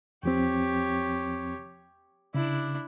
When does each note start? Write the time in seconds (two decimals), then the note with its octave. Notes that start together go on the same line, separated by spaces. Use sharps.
0.23 E2 F3 C4 G4 C#5
2.35 C#3 D4 E4